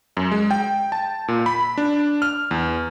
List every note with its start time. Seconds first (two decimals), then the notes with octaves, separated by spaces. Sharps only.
0.17 F#2
0.32 G#3
0.51 G5
0.92 A5
1.28 A#2
1.46 B5
1.78 D4
2.22 F6
2.51 E2